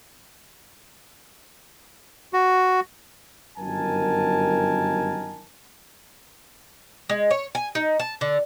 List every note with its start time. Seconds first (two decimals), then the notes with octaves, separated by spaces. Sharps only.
2.33 F#4
3.58 G1 F#2 D#3 A#4 G#5 A5
7.09 G#3
7.31 C#5
7.55 G#5
7.75 D#4
8.00 A5
8.21 D3